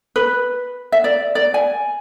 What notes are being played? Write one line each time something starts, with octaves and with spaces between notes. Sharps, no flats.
B4
E5
D5
D5
G#5